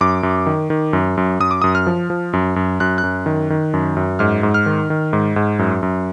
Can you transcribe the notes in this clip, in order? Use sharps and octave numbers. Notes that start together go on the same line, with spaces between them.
F#2 D6
F#2
D#3
D#3
F#2
F#2
F#2 D#6
D6
F#2 D#6
F6
F3
F3
F#2
F#2
F#2 F#6
F#6
F#2
D#3
D#3
F#2
F#2
G#2 F6
G#2
F6
D#3
D#3
G#2
G#2
F#2
F#2